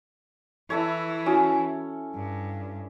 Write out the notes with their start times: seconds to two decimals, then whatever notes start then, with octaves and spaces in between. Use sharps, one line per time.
0.70 E3 E4 A4 C#5
1.26 C#4 E4 F#4
2.15 G2